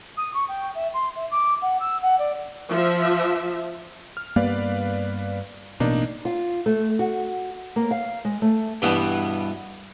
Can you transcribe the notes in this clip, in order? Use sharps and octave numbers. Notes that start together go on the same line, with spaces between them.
D#6
C#6
G5
E5
C6
E5
D6
F#5
E6
F#5
D5
F3 E5
F6
G2 A#3 B3 B4 D5 F5
A1 B2 A#3 D4 D#4
F4
A3
F#4
A#3
F5
G#3
A3
G2 B2 E3 G3 B3